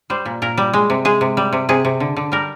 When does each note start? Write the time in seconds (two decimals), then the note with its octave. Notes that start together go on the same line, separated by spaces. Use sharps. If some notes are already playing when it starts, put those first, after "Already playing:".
0.10 G3 C5
0.26 A#2
0.42 A#2 A#4
0.57 G3
0.73 G#3
0.90 C3
1.05 G#3 G#4
1.21 C3
1.37 G3
1.53 C3
1.69 C3 G#4
1.85 C3
2.00 D3
2.17 D3
2.32 G3 A#4